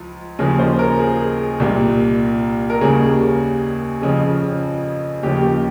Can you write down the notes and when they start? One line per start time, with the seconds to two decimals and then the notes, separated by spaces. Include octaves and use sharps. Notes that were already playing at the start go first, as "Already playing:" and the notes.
Already playing: C#2 F3
0.39 D#2 C#3 F3 G#4
0.59 C5
0.79 A#4
0.99 G#4
1.60 C2 A#2 G3
2.70 A#4
2.81 D#2 C#3 G3 G#4
4.01 F2 C#3 F3 G#4
5.23 D#2 C#3 F3 G4
5.42 G4